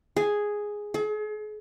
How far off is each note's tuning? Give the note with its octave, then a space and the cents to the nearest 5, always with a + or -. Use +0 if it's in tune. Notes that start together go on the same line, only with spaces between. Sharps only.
G#4 +0
G#4 +40